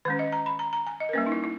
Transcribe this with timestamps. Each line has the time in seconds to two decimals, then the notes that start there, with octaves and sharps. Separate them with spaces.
0.05 D#3 G#3 C#4 B4
0.19 D#5
0.32 A#5
0.46 B5
0.59 A#5
0.73 A#5
0.86 G#5
1.00 D#5
1.09 A#4
1.13 G3 A#3 C#4 B4
1.26 D#4
1.32 E4
1.44 E4